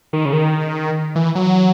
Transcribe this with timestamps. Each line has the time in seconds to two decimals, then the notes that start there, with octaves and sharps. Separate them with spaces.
0.13 D#3
0.25 C#3
0.33 D#3
1.15 E3
1.35 F#3